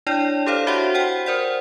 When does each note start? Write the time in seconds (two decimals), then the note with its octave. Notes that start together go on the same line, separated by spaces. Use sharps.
0.07 D4 E4 C#5 D5 G5
0.46 G4 A4 C5 C#5 F5
0.67 E4 F#4 C5 E5 F#5 C6
0.94 C5 F#5 G5
1.26 A#4 C5 D5 F#5